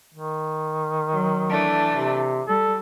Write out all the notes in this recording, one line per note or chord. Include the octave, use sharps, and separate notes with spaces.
D#3
F#3
E3 A3 D4
C3
G3 A4